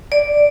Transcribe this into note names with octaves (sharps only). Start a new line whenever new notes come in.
D5